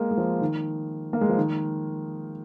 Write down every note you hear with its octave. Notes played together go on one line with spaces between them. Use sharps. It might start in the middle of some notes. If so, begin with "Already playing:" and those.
Already playing: G#3 A#3
G#3
F3
D#3
A#3
G#3
F3
D#3